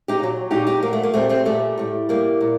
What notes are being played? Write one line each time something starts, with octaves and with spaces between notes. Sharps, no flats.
D#4 G4
A#2 F#3
A#2 F#3 D#4 G4
D#4 G4
A#2 F#3 A#3
A3
A#3
A#2 G3 A3 C4
A3 C4
A#2 G3 A3
A2 G3
A2 G3 A#3
A#2